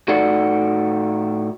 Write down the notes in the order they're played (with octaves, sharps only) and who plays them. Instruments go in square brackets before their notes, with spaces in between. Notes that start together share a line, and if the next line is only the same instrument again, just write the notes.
[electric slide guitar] A2 D#4 F#4 A4 D5 F#5